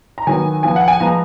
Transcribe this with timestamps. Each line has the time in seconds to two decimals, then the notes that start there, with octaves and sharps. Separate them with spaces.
0.18 A#5
0.27 D#3 F#3 B3 G#5
0.63 F3 B3 G#5
0.76 F#5
0.88 G#5
1.00 F3 G#3 B3 A#5